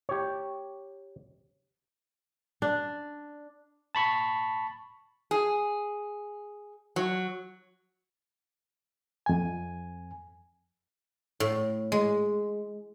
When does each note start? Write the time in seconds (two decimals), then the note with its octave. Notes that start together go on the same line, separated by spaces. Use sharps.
0.09 G4 C#5
2.62 D4
3.95 A5 B5 C#6
5.31 G#4
6.96 F#3
9.26 F2 G#5
11.40 A2
11.92 G#3